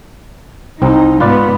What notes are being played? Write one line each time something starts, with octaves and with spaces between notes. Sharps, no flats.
C2 C4 D#4
G#2 B3 F4 B4 D5